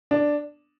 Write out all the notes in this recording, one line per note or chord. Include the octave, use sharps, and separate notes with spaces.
D4